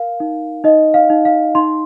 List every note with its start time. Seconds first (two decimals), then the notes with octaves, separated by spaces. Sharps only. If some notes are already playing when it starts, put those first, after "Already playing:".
Already playing: A#4 F5
0.20 D#4
0.64 D#4 D#5
0.94 F5
1.10 D#4
1.25 F5
1.55 D#4 C6